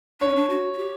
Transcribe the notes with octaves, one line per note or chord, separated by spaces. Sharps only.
D4 C#5
C#4
D4
F#4
F#4
G4